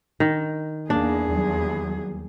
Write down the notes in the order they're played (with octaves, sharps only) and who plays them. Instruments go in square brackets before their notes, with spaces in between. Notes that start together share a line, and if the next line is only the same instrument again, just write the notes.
[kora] D#3
[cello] E2 G#4 [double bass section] A#3 [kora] D4
[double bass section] D#2 F#3 G3